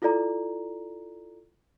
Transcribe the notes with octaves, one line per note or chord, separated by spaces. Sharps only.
E4 F4 A4 D5 A#5